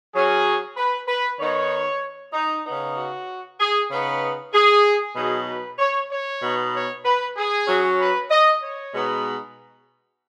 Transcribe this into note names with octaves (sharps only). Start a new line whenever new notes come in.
F#3 C#4 G#4
B4
B4
D#3 B3 D#4 C#5
D#4
C#3 B3 D#4
F#4
G#4
C#3 B3 D#4 B4
G#4
B2 F#3 D#4 G#4
B4
C#5
C#5
B2 B3 D#4
C#5
B4
G#4
F#3 C#4
B4
D#5
C#5
B2 G#3 B3 D#4